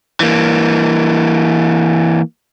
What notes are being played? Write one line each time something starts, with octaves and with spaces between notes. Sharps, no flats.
E3 A#3